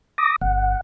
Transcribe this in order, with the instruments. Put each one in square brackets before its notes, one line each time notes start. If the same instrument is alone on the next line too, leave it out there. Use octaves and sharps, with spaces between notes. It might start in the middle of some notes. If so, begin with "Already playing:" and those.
[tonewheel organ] D6 D#6 A#6
[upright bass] G1 [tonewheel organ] F#5